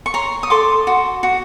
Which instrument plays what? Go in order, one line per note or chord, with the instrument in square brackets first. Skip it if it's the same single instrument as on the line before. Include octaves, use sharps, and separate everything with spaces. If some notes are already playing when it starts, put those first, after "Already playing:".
[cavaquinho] C#6
C#5 A#5 C6
D#6
A4 C6 D6
F#4
F#4